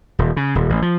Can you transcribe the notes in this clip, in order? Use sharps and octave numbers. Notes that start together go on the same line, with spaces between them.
D#1
C#3
D#1
A1
F3